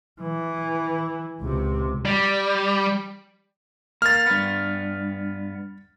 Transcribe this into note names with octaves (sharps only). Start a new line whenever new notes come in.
E3
C#2 C3
G3
A#3 F6 A6
G2 B3